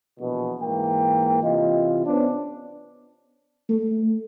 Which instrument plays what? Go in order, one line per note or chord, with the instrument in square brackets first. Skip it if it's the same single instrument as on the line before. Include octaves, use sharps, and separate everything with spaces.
[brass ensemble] A#1 E2 B2
G#2 E3 A#3 G5
C3 E3 F4 D#5
B3 C#4 D4 C5 C#5
[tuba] A3